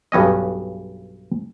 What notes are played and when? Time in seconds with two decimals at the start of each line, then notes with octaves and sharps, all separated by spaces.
0.12 B1 G2 C#4 D#5